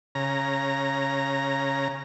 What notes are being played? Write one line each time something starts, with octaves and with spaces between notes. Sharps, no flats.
C#3 A#5